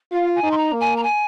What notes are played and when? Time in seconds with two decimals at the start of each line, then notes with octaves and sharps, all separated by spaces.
0.12 F4 F5
0.35 G#5
0.43 D#4
0.51 C6
0.57 A#5
0.73 A#3
0.80 G#5
0.96 A#5
1.03 G#5